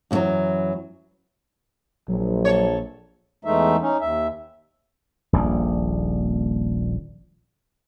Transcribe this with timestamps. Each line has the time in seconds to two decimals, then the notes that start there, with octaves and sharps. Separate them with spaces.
0.11 F#2 B2 D#3 E3 F#3
2.08 A#1 F#3
2.45 A4 C#5
3.45 E2 E3 G#3 A3 D#4 E5
3.81 C#4 D#4
4.01 D#2 E5
5.33 D#1 A#1 G3